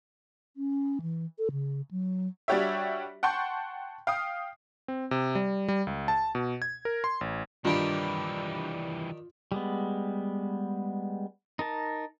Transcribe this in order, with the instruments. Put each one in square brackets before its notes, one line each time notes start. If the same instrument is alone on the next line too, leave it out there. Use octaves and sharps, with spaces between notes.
[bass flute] C#4
E3
A4
C#3
F#3
[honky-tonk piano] G3 D4 F#4 G4 C#5 E5
F#5 G5 A5 C6 C#6 G6
F5 G5 D#6
[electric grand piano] C4
C3
G3
G3
C#2
A5
B2
G#6
A#4
C6
A1
[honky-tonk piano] G2 [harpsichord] D#3 D4 G4 [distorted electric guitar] E3 G3 [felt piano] F4
[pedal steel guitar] G3 G#3 B3
D#4 A#4 A5